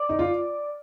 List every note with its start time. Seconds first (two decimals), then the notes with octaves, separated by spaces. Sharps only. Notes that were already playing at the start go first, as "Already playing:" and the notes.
Already playing: D5
0.09 D#4
0.19 F4